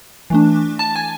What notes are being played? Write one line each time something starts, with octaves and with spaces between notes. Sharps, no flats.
E3 A3 D4
A5
G#5